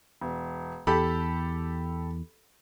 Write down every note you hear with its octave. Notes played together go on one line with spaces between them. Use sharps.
E1
E2 G4 A4 B5